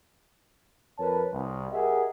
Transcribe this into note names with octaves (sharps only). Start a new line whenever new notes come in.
F2 A#4 B4 C#5 A5
C2
G4 G#4 A#4 D#5 E5 F#5